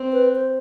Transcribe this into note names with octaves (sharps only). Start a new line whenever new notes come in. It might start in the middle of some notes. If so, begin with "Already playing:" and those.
Already playing: C4
B4
C5